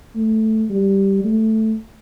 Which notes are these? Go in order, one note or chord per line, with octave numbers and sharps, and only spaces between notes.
A3
G3
A3